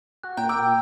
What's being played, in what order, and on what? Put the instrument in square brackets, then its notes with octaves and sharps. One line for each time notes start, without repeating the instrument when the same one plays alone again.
[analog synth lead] F#4 [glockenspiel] F#6
[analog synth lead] A#2 [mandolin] G5 [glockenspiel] A#5
[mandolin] G5 [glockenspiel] A#5 D6 E6